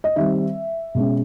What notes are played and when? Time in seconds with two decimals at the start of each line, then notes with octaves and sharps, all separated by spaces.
0.04 D#5
0.16 D#3 G3 C4 E5
0.95 B2 G#3 C#4